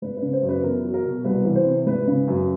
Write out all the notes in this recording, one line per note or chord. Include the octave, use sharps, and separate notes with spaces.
G#1 B4
B4
C#3
C5
F#2
B4
E2 A#4
F#3
A#4
B2
C2 B4
E3
C5
C3
G#1 B4
C#3
F#2